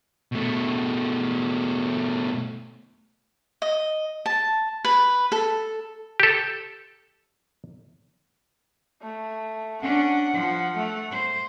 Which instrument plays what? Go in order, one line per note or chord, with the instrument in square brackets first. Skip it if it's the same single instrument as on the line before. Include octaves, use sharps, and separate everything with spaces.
[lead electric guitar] B2 A3
[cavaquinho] D#5
A5
B4
A4
[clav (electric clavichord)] G4 A4
[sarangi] A3
[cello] C#4 D4 [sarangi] F#5
[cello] F3
A3
C5